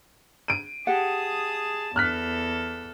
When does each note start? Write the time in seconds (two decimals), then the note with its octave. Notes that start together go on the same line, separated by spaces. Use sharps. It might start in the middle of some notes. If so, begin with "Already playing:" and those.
0.48 D7 D#7
0.87 G4 G#4 F#5 A5 D#6
1.96 E2 A4 F6 F#6 B6